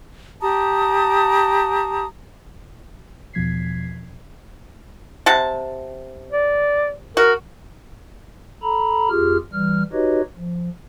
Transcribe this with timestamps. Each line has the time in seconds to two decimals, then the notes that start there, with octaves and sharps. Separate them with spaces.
0.42 G4 A5 A#5 D#6
3.33 E2 B2 F3 G#6 B6 C7
5.26 C3 F#5 A5
6.32 D5
7.17 F#4 A#4
8.63 A4 A#5 B5
9.10 F2 F4 G4 G#4 F6
9.53 E3 G3 F6
9.92 D#4 F#4 G4 B4 C#5 D#5
10.37 F3